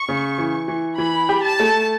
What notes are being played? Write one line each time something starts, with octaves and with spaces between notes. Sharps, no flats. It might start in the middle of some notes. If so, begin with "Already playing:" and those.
Already playing: C#6
C#3
E3
E3
E3 B5
G4
A5
A3